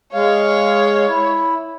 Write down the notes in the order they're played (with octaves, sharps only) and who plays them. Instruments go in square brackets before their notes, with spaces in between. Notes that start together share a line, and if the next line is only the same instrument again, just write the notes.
[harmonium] G#3 F5 [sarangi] C#5
[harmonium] E4